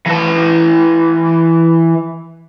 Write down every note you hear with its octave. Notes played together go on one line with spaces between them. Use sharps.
E3 A5